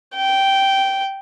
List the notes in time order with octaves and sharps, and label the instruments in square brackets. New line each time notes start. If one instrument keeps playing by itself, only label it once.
[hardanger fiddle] G5